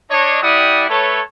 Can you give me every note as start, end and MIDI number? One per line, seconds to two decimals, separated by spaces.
0.11 0.40 62
0.11 0.40 73
0.11 0.40 75
0.42 0.85 55
0.42 0.85 64
0.42 0.85 67
0.42 0.85 74
0.42 0.85 78
0.42 0.85 87
0.89 1.21 57
0.89 1.21 69
0.89 1.21 71
0.89 1.21 73